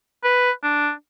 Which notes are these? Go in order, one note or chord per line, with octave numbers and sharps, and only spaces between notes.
B4
D4